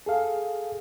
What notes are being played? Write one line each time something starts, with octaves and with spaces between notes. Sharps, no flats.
G#4 A4 F5